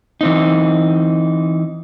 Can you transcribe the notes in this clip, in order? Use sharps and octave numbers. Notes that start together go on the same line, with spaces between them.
E3 C4 D#4